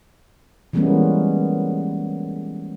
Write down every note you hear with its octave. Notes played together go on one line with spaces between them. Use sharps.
E3 G3 G#3 A#3 B3 C#4